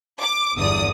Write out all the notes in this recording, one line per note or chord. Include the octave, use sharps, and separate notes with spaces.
D6
G1 E2 D3 D5 D#6